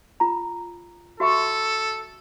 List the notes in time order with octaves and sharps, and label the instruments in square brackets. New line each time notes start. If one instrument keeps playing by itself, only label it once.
[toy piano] F4 A#5
[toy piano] F#4 E5 C#6 [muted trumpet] A4